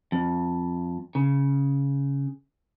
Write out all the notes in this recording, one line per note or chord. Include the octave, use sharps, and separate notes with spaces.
F2
C#3